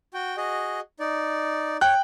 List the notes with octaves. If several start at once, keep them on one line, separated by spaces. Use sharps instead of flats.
F#4 G5
F#4 G#4 D#5
D#4 D5
C#5 G5 F#6